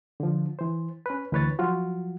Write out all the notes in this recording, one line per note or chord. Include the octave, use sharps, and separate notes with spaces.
D3 F3
E3 C5
C#4 B4
D2 E3 B4 C#5 A6
F3 F#3 F4 F#4